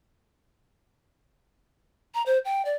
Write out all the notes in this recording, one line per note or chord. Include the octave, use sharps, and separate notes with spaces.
A#5
C5
G5
D5